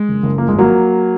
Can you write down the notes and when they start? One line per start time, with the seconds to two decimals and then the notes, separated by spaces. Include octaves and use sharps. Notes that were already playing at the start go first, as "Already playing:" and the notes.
Already playing: G#3
0.09 F#1
0.23 F#1
0.38 F3 A#3
0.48 G#1 G#3
0.58 F#3 A#3